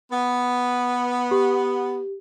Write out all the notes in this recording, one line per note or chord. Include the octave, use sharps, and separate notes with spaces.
B3
G4